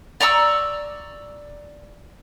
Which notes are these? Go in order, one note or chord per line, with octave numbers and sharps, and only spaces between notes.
D5 A#5 C#6 E6